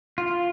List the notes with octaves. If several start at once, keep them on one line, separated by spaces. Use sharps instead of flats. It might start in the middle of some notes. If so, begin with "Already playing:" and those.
F4